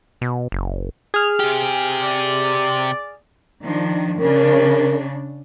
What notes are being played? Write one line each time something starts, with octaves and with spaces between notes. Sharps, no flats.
B2
F#1
G#4 F6
C3 G4
D5
D#3 F3 D4
C#3 D4 A#4